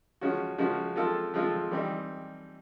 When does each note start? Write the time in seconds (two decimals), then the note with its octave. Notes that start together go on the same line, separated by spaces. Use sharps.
0.21 C#3 F3 G#3 C#4 F#4
0.58 C#3 F3 G#3 C#4 F#4
0.96 F3 G#3 C4 F4 A4
1.34 F3 G#3 C4 F4 A4
1.71 E3 G3 C4 D#4